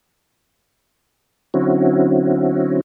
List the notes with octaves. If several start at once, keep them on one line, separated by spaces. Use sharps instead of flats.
D3 F#3 C4 C#4 E4 F#4